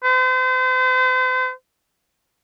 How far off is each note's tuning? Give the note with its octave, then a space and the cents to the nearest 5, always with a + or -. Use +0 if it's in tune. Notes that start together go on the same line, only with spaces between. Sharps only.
C5 -40